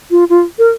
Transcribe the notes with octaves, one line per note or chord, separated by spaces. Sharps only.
F4
F4
A#4